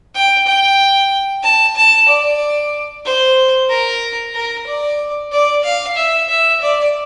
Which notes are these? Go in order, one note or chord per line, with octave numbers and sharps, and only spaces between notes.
G5
G5
A5
A5
D5
C5
A#4
A#4
D5
D5
F5
E5
E5
D5